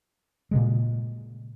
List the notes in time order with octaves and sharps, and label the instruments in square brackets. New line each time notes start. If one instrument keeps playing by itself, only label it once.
[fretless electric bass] A#2 C#3 G#3